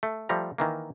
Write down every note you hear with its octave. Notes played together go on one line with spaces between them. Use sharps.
A3
F3 G3 A3 A#5
D#3 E3 A#3